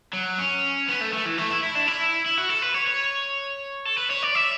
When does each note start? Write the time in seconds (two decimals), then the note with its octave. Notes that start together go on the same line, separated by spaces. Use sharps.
0.13 F#3
0.39 C#4
0.88 B3
1.01 A3
1.13 A3
1.25 E3
1.38 A3
1.50 E4
1.63 E4
1.75 D4
1.87 E4
2.26 E4
2.37 F#4
2.49 A4
2.62 B4
2.74 C#5
2.86 C#5
3.85 A4
3.97 B4
4.10 C#5
4.22 D5
4.35 E5